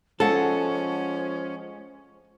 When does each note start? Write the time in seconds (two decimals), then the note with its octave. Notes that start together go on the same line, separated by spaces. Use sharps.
0.20 F3 G#3 C#4 A4 F#5